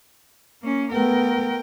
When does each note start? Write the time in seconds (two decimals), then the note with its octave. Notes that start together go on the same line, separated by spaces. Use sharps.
0.62 A#3 C#4
0.92 A3 B3 A#4 G5